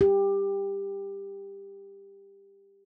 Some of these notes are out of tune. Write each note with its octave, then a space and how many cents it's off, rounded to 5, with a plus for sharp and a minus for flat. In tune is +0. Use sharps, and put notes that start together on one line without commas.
G4 +15